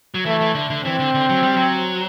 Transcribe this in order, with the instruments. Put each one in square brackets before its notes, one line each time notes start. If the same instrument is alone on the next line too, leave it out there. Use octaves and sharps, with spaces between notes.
[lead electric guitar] F#3
[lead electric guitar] E3 [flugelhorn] A3
[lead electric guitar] E3
D3
D3
[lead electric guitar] E3 [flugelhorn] C4
[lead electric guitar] D3
D3
F#3
G3
F#3